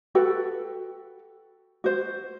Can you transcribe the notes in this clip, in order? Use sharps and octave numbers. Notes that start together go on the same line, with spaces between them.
F#4 A4 B4 G5
F#4 C5